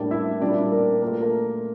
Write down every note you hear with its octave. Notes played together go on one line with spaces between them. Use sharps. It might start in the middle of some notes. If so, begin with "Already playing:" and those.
Already playing: A2 G3 A#3 D4 D5
E4 E5
A#2 G3 A#3 D4 D5
A#3 A#4
A#2 A3 A#4
A4
A#3 A#4